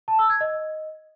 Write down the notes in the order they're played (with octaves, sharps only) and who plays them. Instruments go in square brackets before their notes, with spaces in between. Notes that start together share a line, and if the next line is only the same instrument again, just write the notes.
[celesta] A5
E6
G#6
D#5